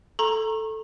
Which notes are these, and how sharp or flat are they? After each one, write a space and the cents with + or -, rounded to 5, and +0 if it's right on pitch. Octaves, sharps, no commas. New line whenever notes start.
A4 +0 A#5 +0 C#6 -35